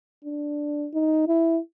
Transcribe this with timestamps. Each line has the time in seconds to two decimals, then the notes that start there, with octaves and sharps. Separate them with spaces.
0.25 D4
0.94 D#4
1.28 E4